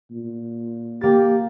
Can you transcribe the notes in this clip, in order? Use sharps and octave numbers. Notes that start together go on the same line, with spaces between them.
A#2
A#3 G4 A6